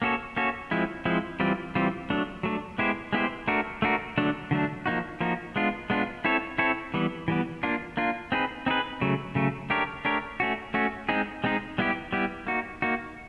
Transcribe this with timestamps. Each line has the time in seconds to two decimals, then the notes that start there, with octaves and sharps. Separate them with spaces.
0.02 A#3 C#4 F#4 A4 C#5
0.36 A#3 C#4 F#4 A4 C#5
0.71 F3 G#3 C4 E4
1.05 F3 G#3 C4 E4
1.40 E3 G3 C4 F4
1.75 E3 G3 C4 F4
2.10 F#3 A3 D4
2.43 F#3 A3 D4
2.78 G#3 B3 E4 G4 C5
3.13 G#3 B3 E4 G4 C5
3.48 A3 D4 F#4 A#4
3.82 A3 D4 F#4 A#4
4.18 D3 F#3 A3 D4
4.51 D3 F#3 A3 D4
4.86 F3 A#3 D#4 F#4
5.21 F3 A#3 D#4 F#4
5.56 G#3 B3 D4 F4
5.90 G#3 B3 D4 F4
6.25 C4 E4 A4 C#5
6.58 C4 E4 A4 C#5
6.94 E3 G3 B3
7.28 E3 G3 B3
7.63 A#3 D4 F4
7.97 A#3 D4 F4
8.32 C4 D#4 G#4 B4
8.66 C4 D#4 G#4 B4
9.01 C#3 F#3 A3
9.35 C#3 F#3 A3
9.70 A3 D4 G4 A#4 C#5
10.05 A3 D4 G4 A#4 C#5
10.40 A3 C#4 F#4
10.74 A3 C#4 F#4
11.09 G#3 C4 D#4 G#4
11.44 G#3 C4 D#4 G#4
11.78 G3 B3 E4 G4
12.13 G3 B3 E4 G4
12.47 A#3 D#4 F#4
12.82 A#3 D#4 F#4